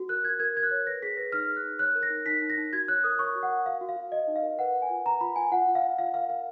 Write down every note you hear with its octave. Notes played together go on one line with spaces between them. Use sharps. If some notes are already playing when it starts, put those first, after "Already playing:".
Already playing: F#4
A#4 F#6
F#4 G#6
A#4 G#6
A#4 G#6
F#6
C#5
B4 A#6
G#4 B6
B4 A#6
D#4 F6
G#4
F#6
D#4
C#5 F#6
A#4
A#6
D#4
D#4 B6
D#4
A#6
D#4
F#4 G#6
C#5 F#6
A#4 D#6
C#5 C#6
F#4
F#5
A#4
F#4 F5
F#4
F5
F#4
F#4 D#5
D#4
F5
A#4
B4 F#5
B4
G#5
F4
B4 A#5
F4 B5
F4 G#5
F4 F#5
F4
F5
F4
F4 F5
A#4 F5
A#4 F5